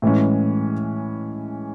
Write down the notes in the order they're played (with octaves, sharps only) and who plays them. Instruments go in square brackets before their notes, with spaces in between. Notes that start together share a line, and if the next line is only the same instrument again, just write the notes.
[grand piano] A2 E3 G#3 C#4